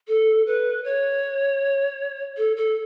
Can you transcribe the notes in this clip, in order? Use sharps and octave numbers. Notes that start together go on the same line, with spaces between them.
A4
B4
C#5
A4
A4